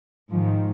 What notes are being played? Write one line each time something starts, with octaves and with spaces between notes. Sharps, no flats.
G#2 D#3 F3